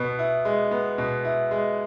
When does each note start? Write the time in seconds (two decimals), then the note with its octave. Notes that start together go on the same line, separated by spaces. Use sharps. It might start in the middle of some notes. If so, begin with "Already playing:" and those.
Already playing: B2 B3
0.19 E4
0.45 G#3
0.71 B3
0.98 B2
1.25 E4
1.51 G#3